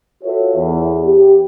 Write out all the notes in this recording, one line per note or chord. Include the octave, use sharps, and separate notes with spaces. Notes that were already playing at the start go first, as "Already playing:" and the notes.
F4 F#4 A4 B4 C#5 E5
E2
G4